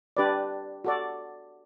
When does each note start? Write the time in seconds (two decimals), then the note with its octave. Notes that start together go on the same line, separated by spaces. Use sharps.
0.17 D4 G4 B4 D5
0.84 F#4 A4 D5